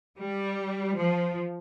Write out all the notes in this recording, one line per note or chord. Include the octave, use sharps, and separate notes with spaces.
G3
F3